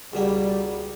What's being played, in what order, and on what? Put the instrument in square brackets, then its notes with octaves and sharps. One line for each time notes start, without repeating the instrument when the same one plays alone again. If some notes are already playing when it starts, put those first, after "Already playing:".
[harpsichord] C#2 B2 A#3 [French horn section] G3